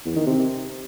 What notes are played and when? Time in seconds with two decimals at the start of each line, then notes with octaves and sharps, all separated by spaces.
0.05 E2
0.16 D#3
0.27 C3